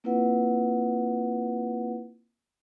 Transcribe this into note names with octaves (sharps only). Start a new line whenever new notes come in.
A#3 C4 E4 F4 B4 F#5